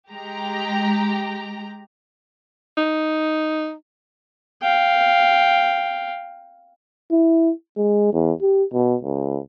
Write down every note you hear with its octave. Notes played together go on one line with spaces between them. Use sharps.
G#3 G4 A#5
D#4
F5 G5
E4
G#3
E2
G4
B2
C#2